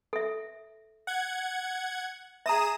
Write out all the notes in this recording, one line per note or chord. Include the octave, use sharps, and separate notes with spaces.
A4 E5
F#5 G#6
G#4 E5 A#5 D#6 E7